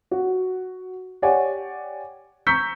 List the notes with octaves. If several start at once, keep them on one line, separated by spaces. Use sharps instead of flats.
F#4
G4 C#5 D5 F#5 G#5
A#5 C#6 E6 G6 B6 C#7